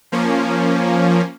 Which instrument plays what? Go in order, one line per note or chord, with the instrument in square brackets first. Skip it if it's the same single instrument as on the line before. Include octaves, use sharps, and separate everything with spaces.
[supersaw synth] F3 A#3 C#4